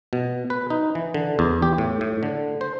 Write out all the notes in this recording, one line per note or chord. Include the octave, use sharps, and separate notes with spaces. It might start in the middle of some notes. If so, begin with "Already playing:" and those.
B2
B4
D#4
E3
D3
E2
G4
A2
A2
D3
C5